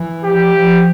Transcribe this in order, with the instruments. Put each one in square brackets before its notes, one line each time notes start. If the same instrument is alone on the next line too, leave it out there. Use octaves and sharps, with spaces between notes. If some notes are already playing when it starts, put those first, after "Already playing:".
Already playing: [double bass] E3
[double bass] F3 [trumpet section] G4
[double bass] F3